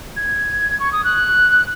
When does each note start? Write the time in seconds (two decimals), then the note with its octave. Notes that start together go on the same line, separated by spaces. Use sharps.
0.16 G#6
0.80 C#6
0.92 D#6
1.04 F#6